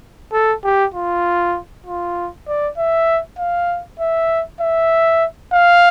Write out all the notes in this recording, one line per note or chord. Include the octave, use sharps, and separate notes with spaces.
A4
G4
F4
F4
D5
E5
F5
E5
E5
F5